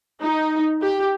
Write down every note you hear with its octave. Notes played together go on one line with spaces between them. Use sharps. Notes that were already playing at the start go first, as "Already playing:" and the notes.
D#4
G4